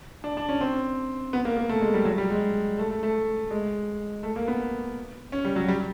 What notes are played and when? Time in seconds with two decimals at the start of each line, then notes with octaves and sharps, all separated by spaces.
0.24 D4
0.37 D4
0.49 C#4
0.61 C4
1.33 B3
1.45 A#3
1.57 A#3
1.69 A3
1.81 G#3
1.94 G3
2.05 F#3
2.18 G3
2.30 G#3
2.79 A3
2.90 A3
3.03 A3
3.50 G#3
4.23 A3
4.36 A#3
4.48 B3
5.32 C#4
5.45 G3
5.56 F#3
5.68 G3